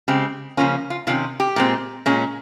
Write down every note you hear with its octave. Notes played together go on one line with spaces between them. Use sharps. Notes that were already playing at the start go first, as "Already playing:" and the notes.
C#3 G#3 C4 G4
C#3 F3 A#3 C#4 F4
F4
C3 D#3 C#4 F4
G4
A#2 G#3 C4
A#2 G#3 C#4